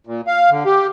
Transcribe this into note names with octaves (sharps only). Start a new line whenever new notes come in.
A#2
F5
D3
G4